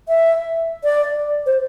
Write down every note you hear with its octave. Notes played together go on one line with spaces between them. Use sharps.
E5
D5
C5